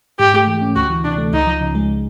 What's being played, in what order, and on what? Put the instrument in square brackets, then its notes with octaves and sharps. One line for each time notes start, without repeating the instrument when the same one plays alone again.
[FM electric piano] G#2 [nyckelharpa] G4
[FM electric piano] A3
E3
C#4
[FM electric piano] D2 [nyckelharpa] F#4
[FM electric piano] E3
[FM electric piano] C3 [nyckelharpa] D4
[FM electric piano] A3
[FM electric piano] C#2 [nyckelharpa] D#4
[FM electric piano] F3
C#3
G#3